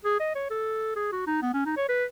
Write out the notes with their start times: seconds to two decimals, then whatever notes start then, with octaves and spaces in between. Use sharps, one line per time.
0.04 G#4
0.20 D#5
0.35 C#5
0.50 A4
0.96 G#4
1.12 F#4
1.27 D#4
1.42 B3
1.54 C#4
1.65 D#4
1.77 C#5
1.89 B4